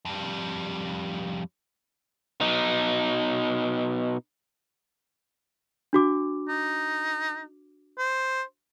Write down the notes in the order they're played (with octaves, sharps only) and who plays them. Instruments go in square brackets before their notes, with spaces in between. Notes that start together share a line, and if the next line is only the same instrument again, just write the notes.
[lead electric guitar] F2 G3
B2 D#4
[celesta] D4 F#4 D6
[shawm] D#4
C5